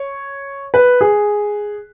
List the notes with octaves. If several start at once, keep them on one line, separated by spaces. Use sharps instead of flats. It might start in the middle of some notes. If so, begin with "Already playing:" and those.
Already playing: C#5
B4
G#4